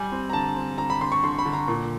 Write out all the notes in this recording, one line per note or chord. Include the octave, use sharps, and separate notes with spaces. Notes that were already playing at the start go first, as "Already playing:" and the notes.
Already playing: G3 G#5
C4
A#5
D3 A5
C4
D3 A#5
B5
D3 C6
C#6
D3 C6
B5
D3
A#5
A#2